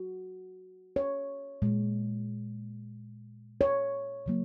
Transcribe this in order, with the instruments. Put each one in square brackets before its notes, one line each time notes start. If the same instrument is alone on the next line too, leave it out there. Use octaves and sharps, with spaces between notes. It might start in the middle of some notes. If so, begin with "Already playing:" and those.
Already playing: [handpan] F#4
C#5
A#2 G#3
C#5
C#3 F#3 A#3